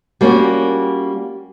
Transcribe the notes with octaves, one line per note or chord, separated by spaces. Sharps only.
G3 A#3 B3 C#4 F4 F#4